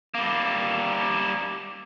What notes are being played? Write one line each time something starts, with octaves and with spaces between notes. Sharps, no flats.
G3 A#3